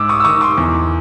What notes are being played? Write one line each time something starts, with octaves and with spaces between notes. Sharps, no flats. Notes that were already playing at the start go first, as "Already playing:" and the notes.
Already playing: G#2 D6 E6
C#6 D#6
E6
D#3 C#6 D#6
C6 D6
E2